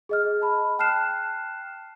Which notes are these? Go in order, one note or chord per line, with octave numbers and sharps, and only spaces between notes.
G#4 D#5 F6
A5 B5
G5 A5 F6 F#6 C7 E7